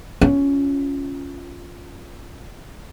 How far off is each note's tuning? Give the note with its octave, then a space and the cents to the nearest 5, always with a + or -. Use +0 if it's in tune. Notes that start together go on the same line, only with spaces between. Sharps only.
C#4 +10 F4 +0